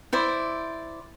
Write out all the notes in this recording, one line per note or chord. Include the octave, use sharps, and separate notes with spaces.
E4 C5 D5